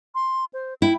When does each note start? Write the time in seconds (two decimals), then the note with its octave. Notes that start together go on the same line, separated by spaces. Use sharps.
0.15 C6
0.53 C5
0.82 E4 G5